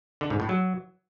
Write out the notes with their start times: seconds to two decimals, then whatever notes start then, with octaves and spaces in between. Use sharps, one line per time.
0.21 D3
0.30 G#2
0.40 A2
0.49 F#3